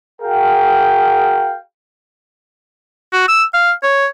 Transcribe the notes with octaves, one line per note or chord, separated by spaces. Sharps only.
F#4 G#4 A#4 F5 G5
F#4
E6
F5
C#5